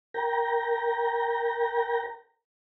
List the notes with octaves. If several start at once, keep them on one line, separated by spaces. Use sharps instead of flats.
A#4 G5 A#5